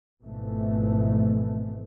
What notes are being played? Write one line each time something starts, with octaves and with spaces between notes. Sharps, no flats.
G#1 G#2 B2 E3 F3 A3